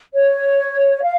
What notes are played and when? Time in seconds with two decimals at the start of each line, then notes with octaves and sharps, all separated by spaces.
0.14 C#5
1.02 F5